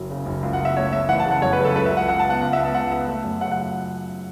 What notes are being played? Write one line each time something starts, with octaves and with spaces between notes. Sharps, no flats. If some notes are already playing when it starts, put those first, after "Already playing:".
Already playing: F#1 F#3
C#3
F#1
C#2
F#5
C#2
E5
A3 C#5
A3 E5
E3 F#5
A5
C#3
F#5
F#2 C#5
B4
C#3
A4
C#2 B4
E5
C#2
F#5
C#2 F#5
A5
B3
F#5
C#2 F#5
E5
B3
A5
C#2 F#5
B3 E5
A3
F#2
C#3 F#5
F#5